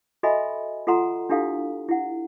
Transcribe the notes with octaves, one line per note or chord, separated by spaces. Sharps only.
F#4 A4 D#5 E5 G#5 B5
F4 A4 F#5 A#5 C6
D4 E4 G4 A4 F5
E4 F#5